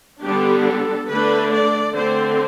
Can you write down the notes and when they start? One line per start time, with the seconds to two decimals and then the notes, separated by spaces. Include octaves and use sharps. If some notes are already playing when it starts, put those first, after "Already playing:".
0.23 D3 G3 B3 D4 G4
0.66 A4
1.09 D3 A3 D4 B4
1.53 D5
1.96 D3 A3 C4 C5